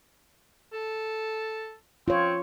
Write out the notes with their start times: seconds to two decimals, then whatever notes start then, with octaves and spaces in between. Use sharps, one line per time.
0.73 A4
2.08 C4 F4 C#5